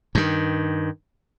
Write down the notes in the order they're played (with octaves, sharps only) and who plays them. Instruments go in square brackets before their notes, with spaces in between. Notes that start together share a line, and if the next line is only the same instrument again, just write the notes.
[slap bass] G2 D#3